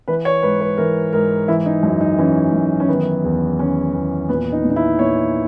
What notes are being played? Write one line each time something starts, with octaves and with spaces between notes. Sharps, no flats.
E3 B4
C#5
G#2 B4
B4
E3 A#4
G#2 A#4
E3 E4
D#4
F#2
D#4
E3 C#4
F#2
C#4
D#3 B3
E2
D#3 C#4
E2
A#2 B3
D#4
A#2
D#4
E4
A#2 C#5